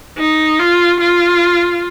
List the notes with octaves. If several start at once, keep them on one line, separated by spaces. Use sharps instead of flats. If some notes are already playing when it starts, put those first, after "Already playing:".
D#4
F4
F4